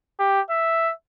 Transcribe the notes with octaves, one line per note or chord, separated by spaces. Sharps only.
G4
E5